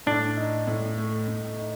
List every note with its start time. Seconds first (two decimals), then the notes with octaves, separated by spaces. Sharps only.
0.07 A2 D4
0.37 D#4
0.67 A2
0.98 A3
1.28 A2
1.59 D#4